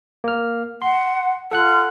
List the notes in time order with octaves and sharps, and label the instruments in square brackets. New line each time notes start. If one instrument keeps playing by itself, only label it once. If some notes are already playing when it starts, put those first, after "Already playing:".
[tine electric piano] A#3 F6
[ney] F#5 [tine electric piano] C6
[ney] F4 [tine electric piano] A4 F#5 F#6